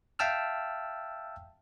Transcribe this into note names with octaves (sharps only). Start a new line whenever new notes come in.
E5 F5 G5 A5 E6 F6